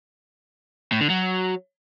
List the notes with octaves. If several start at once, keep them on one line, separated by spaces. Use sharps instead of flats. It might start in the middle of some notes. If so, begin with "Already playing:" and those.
A2
D3
F#3